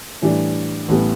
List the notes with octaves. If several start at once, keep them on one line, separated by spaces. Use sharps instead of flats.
A2 E3 G3 D4
A1 A2 E3 G3 B3